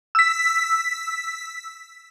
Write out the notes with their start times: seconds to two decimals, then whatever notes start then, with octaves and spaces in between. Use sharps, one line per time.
0.15 E6 B6